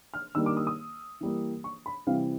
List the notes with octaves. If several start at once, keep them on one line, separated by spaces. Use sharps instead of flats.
F6
D#3 G3 A#3 D4 E6
D6
D#6
D#6
E3 G3 A#3
C#6
B5
C3 E3 G3 C4 F5